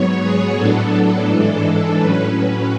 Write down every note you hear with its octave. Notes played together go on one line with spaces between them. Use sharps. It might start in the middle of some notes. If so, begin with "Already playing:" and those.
Already playing: G#2 F#3 B3 C#5
G#4
A2 F#3 B3 D4 A4
G#2 E3 G#3 D4
A2 F#3 C#4 B4
B4